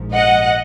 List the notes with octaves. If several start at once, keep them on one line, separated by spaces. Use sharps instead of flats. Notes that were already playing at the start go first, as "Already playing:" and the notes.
Already playing: A#1 G#2 F3
D#5 F#5